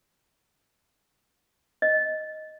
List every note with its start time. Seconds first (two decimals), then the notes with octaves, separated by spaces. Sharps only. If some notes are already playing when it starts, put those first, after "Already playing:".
1.82 D#5